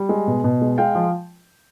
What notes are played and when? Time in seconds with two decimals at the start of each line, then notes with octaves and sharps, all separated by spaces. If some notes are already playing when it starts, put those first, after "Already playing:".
Already playing: G3
0.09 G#3
0.27 B2
0.44 B2
0.62 G#3
0.78 G#3 F5 G5
0.95 F3